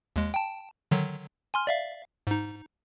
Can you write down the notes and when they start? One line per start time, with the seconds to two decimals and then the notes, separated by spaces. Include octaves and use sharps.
0.16 D#2 G#3
0.34 G5 A5
0.91 D3 D#3 F#3
1.54 G#5 C6 F6
1.67 D5 E5 F5
2.27 G#2 D#4